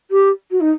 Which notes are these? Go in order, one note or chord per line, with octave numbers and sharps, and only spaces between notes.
G4
F#4
D#4